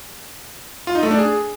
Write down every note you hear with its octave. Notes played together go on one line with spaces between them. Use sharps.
F4
D#4
A3
D4
G#4